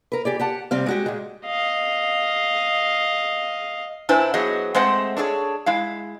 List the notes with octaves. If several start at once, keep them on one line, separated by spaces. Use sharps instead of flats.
A#4 B4
G4 G#4 D5
G4 F#5 A5
C3 G3 C4 F5
G#3 F#4 G4
A#2 G#3
D#5 F5
A#2 D4 E4 B4 C5 G#5
F#3 B3 G#4 C5 D#5 F#5
G#3 A3 C4 C5 D#5 F#5
D4 G#4 A4 C#5
G#3 E4 F5